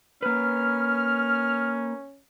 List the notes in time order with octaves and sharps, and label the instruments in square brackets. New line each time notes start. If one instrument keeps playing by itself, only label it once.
[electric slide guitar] A#3 B4 [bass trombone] C#4 [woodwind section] F6